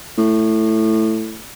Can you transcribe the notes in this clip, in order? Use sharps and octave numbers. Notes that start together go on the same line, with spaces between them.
A2